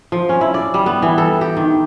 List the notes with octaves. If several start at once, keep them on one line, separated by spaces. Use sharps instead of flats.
F3
C#4
E4
D5
G3
B3
E3
A4
G4
D#3